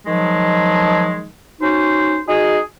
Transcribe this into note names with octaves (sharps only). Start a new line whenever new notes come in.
D#3 F3 F#3 G#3
C#4 D#4 F#4 C5
D#4 F#4 G#4